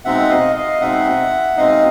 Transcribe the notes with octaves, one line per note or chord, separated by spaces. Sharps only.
B2 G#3 C4 D#4 E5 F#5
D#5 F5
D#5 F5
B2 G#3 C4 D#4 E5 F#5
B2 G#3 C4 D#4 D#5 F5